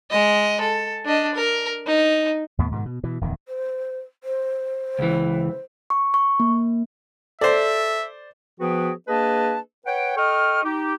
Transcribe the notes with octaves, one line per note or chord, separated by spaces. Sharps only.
G#3 D#5
A4
D4 D#5
A#4
D#4
D#2 A2 B3
G#2 B2 D3 D#3
B2
B2 E3
D1 E2 D#3
C5
C5
C#2 E3
C#6
C#6
A#3
A4 C5 D5 E5
F3 B3 F#4 G#4 B4 G5
A#3 D4 G#4 B4 D#5 A5
B4 C#5 F#5 G5
A4 D#5 G5 C#6 F6
D#4 G4